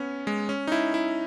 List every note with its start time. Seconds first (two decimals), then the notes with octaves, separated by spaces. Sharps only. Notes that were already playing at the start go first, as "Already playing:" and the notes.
Already playing: B3 C#4
0.27 G#3
0.49 C#4
0.67 D#4
0.72 E4
0.94 E4